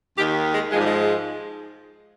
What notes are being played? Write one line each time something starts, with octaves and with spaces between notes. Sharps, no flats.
D#2 D#3 G4
G#3
G#2 F3 G3 G#3
G#3